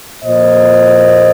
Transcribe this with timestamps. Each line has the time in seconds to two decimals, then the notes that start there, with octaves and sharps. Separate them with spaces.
0.22 A#2 F3 A#3 C5 D#5